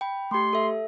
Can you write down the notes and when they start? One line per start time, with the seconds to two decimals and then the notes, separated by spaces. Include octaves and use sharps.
0.01 G5 B5
0.31 A3 G4 C6
0.53 A4 E5